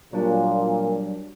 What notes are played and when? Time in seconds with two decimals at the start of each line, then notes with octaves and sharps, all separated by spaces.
0.13 A#2 F#3 G3 D4